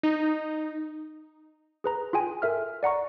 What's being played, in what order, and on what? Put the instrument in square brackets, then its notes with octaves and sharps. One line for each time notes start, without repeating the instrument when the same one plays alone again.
[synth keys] D#4
[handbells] G#4 B4 A#5
F4 G#4 G5 G#5
A4 A#4 E5 F6
D5 F#5 A#5 C#6